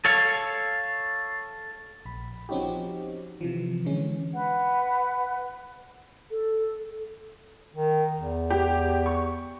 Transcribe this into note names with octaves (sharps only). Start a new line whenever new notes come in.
A4 C#5 F5
A#1 B5
F3 C4 C#4 D#4 F#4 G4
C3 E3 F3
D3 E3 G#3 C#4
B4 F#5
A4
D#3
E2
G4
C#6